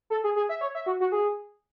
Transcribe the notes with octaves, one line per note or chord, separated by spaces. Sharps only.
A4
G#4
G#4
E5
C#5
E5
F#4
F#4
G#4